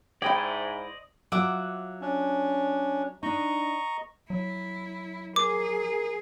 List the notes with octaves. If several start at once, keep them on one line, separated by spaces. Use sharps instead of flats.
G#2 E4 C5 D5 D#5 G5 G#5 B5
F#3 F4 E5 F#5 D6
C#4 D4
D4 D#4 D#5 A#5 C#6
F#3 E4
G#4 A#4 D6